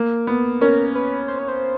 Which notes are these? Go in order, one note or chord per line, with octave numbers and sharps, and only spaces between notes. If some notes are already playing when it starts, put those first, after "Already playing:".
Already playing: A#3
B3
C#4 A#4
B4
C5
C#5
C5